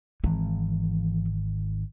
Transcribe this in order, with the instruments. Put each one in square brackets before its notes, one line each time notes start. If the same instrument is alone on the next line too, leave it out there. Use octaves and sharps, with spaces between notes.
[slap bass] G#1 [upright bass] E3